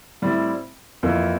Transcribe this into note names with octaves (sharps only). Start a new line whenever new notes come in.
A2 G3 C4 E4
F2 E3 A#3 E4